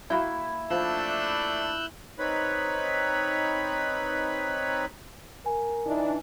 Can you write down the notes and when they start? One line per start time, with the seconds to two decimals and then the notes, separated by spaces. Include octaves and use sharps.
0.10 A#3 E4 F#4 G5
0.70 F3 A3 D4 E6 F#6 G6
2.19 C4 D#4 B4 C#5 B5
5.46 A#4 G#5
5.87 E3 D4 D#4